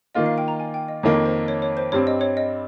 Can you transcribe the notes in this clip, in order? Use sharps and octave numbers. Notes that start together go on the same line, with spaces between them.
D#3 A#3 F4 D#5
F5
G5
A#5
G#5
G5
D#5
F2 D#3 A#3 C#5
C5
C#5
C#5
C5
G2 G3 C4 C#5
D#5
C#5
D#5